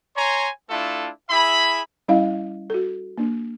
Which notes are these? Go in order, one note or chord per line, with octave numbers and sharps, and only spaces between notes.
C#5 G#5 A#5 C6
A3 D4 E4 F4 A4
E4 G#4 E5 B5
G3 C#4 E4 D#5 F5
F#4 A4
A#3 D4